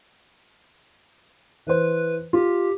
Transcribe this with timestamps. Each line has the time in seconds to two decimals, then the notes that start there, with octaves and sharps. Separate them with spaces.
1.67 E3 B4 C5
2.33 F4 G4